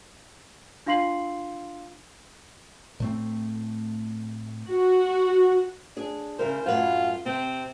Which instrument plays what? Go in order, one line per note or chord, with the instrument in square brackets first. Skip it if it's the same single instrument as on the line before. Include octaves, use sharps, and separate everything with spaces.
[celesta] D4 F4 F5 C6 C7 F#7
[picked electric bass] A2 A3 C4
[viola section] F#4
[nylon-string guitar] D4 G#4
[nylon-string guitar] C#3 E4 A#4 [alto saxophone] C5
[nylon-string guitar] F#2 A2 B4 [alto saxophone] F4
[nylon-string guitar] C3 [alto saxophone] C4